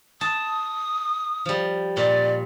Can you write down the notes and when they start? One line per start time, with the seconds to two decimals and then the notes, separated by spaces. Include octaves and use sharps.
0.21 A5 D#6
1.45 F3 G3
1.97 A#2 D5